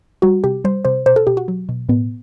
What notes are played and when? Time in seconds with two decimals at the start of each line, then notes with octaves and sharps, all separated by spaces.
0.22 G3 F#4
0.44 C3 G4
0.65 G3 C5
0.85 C3 C5
1.06 B2 C5
1.16 A4
1.27 B2 G4
1.37 F#4
1.48 F#3
1.69 B2
1.89 A2 B3